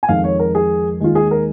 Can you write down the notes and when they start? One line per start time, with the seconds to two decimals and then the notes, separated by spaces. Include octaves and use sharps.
0.03 G#5
0.09 F2 D#3 G#3 F5
0.24 C#5
0.39 A#4
0.55 G#4
1.00 D#2 D#3 G#3 F4
1.15 G#4
1.31 A#4